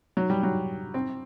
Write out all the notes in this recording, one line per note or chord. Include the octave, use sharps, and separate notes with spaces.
F#3
G3
F#3
C4